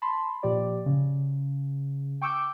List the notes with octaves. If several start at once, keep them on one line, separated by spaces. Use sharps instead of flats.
A5 B5 C6
A#2 F3 G4 D5
C#3
G5 C#6 D6 E6 G6